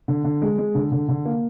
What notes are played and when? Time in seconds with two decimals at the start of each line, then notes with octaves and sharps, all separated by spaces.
0.08 D3
0.24 D3
0.42 G#3
0.58 G#3
0.75 D3
0.92 D3
1.08 D3
1.25 A#3